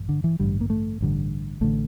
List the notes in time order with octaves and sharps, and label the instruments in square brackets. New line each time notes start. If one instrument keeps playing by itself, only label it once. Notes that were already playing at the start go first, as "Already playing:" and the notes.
Already playing: [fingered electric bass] A1 G2
D3
E3
A1 G2 D3 G3
A#3
A3
A1 G2 D3
A1 D3 A3